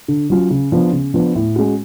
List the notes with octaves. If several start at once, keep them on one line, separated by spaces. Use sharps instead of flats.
D3
F#3 C#4 F4
C#3
F3 B3 D4
C#3
F3 B3 D4
A2
G#3 C#4 F#4